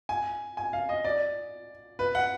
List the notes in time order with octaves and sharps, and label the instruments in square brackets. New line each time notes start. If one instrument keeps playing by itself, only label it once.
[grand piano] G#5
G#5
F5
D#5
D5
B4
F#5